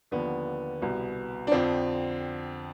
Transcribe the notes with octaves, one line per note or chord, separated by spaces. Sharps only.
D#2 D3 F3 B3
C2 B2
D4
F2 D3 F3 C4